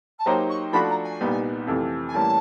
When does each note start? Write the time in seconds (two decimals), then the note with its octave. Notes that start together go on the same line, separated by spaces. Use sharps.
0.19 A5
0.26 F#3 A#3 D#4 G4 C5 A#5
0.49 C#6
0.73 F3 A3 D4 F#4 B5
0.89 A#5
1.04 G#5
1.21 C2 A#2 G3 B3 D#4
1.67 F2 C3 E3 A3
2.08 G#5
2.14 A2 E3 G3 A#3 C#4 A5